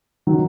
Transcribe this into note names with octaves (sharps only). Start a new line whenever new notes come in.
D#3 F#3